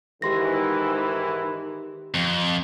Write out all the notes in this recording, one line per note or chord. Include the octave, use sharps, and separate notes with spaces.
G#2 D#3 E3 G4 C6 A#6
F2